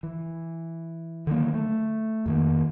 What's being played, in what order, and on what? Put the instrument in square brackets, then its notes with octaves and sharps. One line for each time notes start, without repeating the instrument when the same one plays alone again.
[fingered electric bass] E3
D3 D#3 F#3 A#3
A3
F2 D#3 A#3